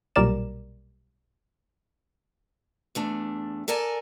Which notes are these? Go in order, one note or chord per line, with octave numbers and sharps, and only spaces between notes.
B1 A#2 G3 A#4 D5 E7
E2 A3 D4
A4 A#4 D5 G#5 A5